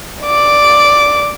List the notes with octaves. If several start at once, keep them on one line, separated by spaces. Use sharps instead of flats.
D5 D6